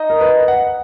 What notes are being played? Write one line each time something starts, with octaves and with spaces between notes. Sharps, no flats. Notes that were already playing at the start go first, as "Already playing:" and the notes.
Already playing: D#4 D#5
A#4
B4
F#5